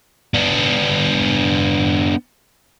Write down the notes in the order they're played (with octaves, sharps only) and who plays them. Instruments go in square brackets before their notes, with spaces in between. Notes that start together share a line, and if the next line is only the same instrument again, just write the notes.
[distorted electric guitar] B3 D4